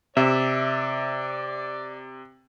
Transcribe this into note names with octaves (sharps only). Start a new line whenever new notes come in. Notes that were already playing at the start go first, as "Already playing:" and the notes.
C3 D5 E5